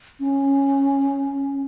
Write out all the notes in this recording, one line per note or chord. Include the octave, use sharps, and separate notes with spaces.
C#4